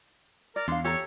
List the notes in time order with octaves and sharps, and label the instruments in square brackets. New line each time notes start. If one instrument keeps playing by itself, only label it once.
[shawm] A#4 [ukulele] D5
[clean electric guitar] E2 [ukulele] D4 F5 [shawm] C6
[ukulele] G4 A4 A#5 [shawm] C#5